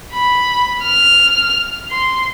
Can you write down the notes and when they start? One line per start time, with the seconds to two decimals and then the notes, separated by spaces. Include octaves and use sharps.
0.13 B5
0.84 F6
1.91 C6